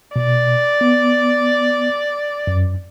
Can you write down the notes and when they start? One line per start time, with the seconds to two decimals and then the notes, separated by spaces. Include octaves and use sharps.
0.16 B2 D5
0.81 B3
2.47 F#2